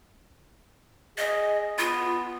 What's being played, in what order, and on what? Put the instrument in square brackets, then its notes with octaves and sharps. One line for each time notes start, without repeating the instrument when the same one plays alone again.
[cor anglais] G#4 [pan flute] D#5
[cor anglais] B3 [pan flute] F4